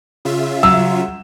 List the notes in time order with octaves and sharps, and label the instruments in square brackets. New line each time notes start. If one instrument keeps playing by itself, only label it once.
[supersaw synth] C#3 F4 E5
[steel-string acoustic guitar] F#3 [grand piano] E6